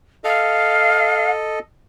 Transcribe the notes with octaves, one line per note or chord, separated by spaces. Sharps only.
A4 D#5 F5